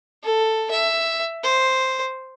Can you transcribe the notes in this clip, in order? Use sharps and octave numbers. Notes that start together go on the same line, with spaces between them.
A4
E5
C5